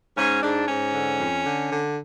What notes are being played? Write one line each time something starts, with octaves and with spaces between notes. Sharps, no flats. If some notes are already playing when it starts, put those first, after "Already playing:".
G#2 C#4
G#2 D4
G#2 C#4
D3
F2
D3
D3